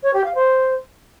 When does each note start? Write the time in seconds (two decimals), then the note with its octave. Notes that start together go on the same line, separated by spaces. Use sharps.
0.03 C#5
0.13 G4
0.24 F5
0.34 C5